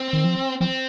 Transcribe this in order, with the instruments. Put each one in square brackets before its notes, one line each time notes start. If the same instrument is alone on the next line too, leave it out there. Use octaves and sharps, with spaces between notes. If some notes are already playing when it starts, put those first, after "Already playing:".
Already playing: [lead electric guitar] C4
[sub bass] D#3
F3
[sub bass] F3 [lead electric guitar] C4